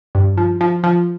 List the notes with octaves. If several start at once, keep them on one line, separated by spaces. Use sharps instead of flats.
G2
F3
F3
F3